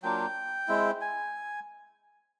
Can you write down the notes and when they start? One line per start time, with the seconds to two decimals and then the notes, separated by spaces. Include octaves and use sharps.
0.03 F#3 A#3 D4 F4 G5
0.68 G#3 C4 E4
1.01 G#5